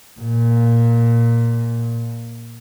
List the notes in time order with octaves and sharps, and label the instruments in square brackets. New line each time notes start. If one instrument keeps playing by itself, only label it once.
[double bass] A#2